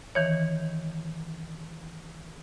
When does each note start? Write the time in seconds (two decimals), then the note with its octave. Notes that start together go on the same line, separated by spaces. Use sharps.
0.15 D#3 E3 C#5